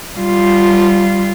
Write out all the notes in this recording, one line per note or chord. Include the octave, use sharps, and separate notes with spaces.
G3 F4